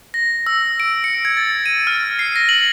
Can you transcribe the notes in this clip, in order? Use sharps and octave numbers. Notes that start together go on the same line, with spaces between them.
A#6
E6
D7
C#7
G#6
A6
D#7
F6
C7
A#6
F#7